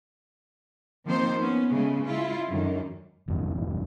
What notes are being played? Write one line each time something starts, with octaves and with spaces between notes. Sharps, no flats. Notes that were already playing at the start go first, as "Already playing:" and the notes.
D#3 F3 A#3 C4 D#4 C5
B3 C#4
C#3 G#3 A3 B3
G#3 E4 F4
F#2 D3 D#3
F1 E2 G2 D#3